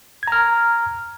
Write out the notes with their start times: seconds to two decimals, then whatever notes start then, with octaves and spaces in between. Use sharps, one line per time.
0.23 G#6
0.28 A#5
0.32 F6